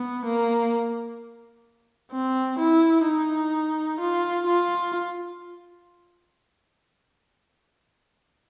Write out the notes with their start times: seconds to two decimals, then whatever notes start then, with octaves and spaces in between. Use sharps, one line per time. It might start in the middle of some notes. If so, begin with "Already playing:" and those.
Already playing: B3
0.26 A#3
2.12 C4
2.59 E4
3.06 D#4
4.00 F4
4.47 F4